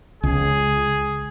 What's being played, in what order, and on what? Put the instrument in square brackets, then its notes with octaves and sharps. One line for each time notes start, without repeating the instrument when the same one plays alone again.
[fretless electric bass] C#2 [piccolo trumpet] G#4